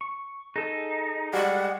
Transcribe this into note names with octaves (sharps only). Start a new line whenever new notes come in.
C#6
D#4 G#4 A4 D#5
G3 G#3 F#5